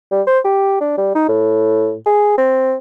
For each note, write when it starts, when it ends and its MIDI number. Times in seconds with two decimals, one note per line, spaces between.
0.11 0.22 55
0.27 0.39 72
0.44 0.78 67
0.81 0.94 62
0.97 1.10 55
1.15 1.28 63
1.28 1.95 45
2.06 2.34 68
2.38 2.75 60